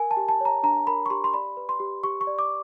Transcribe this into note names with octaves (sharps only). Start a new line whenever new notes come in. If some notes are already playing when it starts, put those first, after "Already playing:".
Already playing: A#4 G#5
A5
G4
A5
C#5 A#5
D4 A#5
A#4 B5
C#6
G4 C6
C6
D5 B5
B4
C6
G4
G4 C#6
C#6
D5
D6